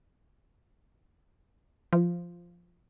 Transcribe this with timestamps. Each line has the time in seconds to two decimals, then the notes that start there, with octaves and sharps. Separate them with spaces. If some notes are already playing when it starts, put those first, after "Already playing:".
1.93 F3